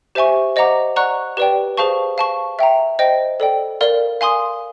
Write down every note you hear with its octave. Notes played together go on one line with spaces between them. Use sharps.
G4 C5 E5 G#5 C#6
C5 D#5 F#5 A#5 D6
D5 F#5 A#5 C#6 F#6
G4 B4 D5 G5
G#4 C5 F5 A5 C#6
F5 A5 C#6
E5 G5 A#5
C5 D#5 G5
A4 D5 G5
A#4 D5 F5
F5 G#5 C6 D#6